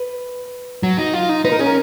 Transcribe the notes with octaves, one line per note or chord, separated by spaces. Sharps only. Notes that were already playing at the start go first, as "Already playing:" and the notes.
Already playing: B4
F#3
D#4
F4
D#4
D#4 B4
A#4
C#4 G#4
A#4